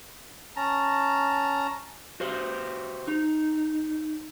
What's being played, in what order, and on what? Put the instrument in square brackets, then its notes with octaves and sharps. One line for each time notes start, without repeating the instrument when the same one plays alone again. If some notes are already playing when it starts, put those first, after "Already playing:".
[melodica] C#4 A5 A#5
[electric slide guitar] F#4 G4 C5
D#4